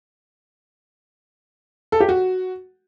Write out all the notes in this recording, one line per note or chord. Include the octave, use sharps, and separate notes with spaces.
A4
G4
F#4